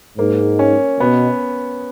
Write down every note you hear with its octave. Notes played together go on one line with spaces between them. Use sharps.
G#2 A#3
C#4
B2 B3